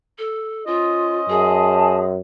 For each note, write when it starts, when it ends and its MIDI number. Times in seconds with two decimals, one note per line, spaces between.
0.19 0.65 69
0.67 2.12 61
0.67 1.19 65
0.67 2.12 72
0.67 2.12 75
1.30 2.19 42
1.30 2.04 68
1.30 1.94 80
1.30 1.94 81